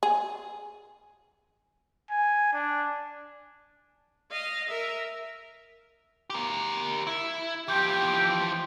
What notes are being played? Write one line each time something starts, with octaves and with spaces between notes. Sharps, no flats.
G#4
G#5
D4
D#5 F5
A#4 E5
G4 A#4
E4
E3 F3 G4 G5